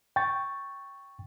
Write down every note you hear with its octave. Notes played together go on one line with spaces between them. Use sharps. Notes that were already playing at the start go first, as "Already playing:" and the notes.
G5 C#6 A6